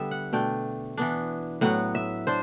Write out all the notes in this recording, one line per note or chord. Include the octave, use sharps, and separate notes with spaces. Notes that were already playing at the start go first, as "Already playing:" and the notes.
Already playing: D3 G3 B3 E5
F#5
B2 A3 D4 G5
E3 B3 D4
A2 F#3 B3 F#5
E5
D4 C5